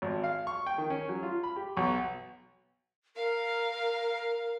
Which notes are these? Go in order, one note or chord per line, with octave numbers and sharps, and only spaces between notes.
G#1
F5
C#6
G5
D#3
C#4
F#3
F4
B5
G4
B1
A#4 F5